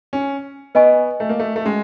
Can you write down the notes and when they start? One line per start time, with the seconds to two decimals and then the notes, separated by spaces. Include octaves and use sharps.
0.13 C#4
0.75 B3 B4 D#5 G#5 C#6
1.20 A3
1.29 A#3
1.39 A3
1.56 A3
1.65 G#3 C#4 F#4